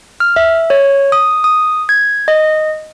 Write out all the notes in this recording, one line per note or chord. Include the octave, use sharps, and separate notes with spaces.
F6
E5
C#5
D#6
D#6
G#6
D#5